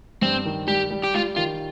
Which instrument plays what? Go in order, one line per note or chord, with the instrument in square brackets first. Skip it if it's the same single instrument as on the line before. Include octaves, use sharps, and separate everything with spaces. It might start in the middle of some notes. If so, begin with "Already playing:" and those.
[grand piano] G2 [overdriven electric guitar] C4
[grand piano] D#3
[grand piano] G3 [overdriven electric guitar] G4
[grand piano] G3
[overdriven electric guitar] G4
[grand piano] G3 [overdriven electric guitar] F4
[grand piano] D#3 [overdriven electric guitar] F4